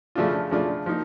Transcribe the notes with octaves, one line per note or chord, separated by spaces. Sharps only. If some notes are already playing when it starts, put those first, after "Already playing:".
C#3 F3 A3 D4 F4
C#3 F3 A3 D4 F4
F3 A#3 D#4